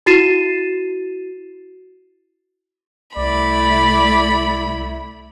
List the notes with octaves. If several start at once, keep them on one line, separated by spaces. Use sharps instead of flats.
E4 F#4 A6 C7 D#7 E7
C2 A3 E4 D5 B5